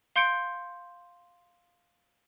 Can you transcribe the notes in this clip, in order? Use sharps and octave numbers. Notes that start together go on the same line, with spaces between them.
F5 C6 G6 C#7 D7